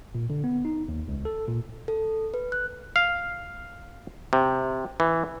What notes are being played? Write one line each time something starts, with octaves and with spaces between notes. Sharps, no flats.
A#2
D3
B3
D#4
D#2
C#2
A4
A#2
A4
B4
F#6
F5
C3
E3